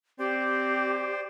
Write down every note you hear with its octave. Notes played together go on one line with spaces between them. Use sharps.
C4 G4 C5 D5